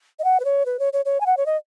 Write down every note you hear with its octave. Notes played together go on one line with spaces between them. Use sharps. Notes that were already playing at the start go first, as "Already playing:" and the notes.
D#5
F#5
B4
C#5
B4
C#5
C#5
C#5
G#5
F#5
C#5
D#5